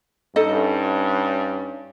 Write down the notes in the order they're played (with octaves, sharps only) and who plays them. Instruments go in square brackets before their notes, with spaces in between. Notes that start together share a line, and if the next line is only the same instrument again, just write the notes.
[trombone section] G2 C#4 [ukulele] D#4 A4 D#5